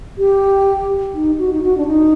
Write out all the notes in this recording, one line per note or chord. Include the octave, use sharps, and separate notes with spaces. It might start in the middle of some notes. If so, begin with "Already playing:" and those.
G4
D#4
F#4
D#4
F#4
D4
D#4